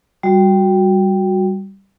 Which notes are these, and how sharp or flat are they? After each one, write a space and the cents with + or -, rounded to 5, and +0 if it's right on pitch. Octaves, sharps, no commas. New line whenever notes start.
G3 +0 F#4 -10